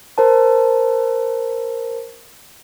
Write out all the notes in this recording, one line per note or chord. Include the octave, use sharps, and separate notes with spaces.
A#4 C5 A5